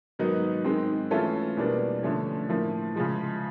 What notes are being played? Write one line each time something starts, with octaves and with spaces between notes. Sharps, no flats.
G#2 D#3 F#3 B3 D#4
G#2 D#3 G#3 C4
E3 A3 C#4 F4 A4
E2 B2 G3 A#3 D4
D3 F3 A3 C#4
A2 F3 A#3
C#3 F3 G#3